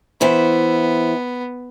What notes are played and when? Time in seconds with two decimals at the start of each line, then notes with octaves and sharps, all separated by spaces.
0.21 E3 B3 E4 C5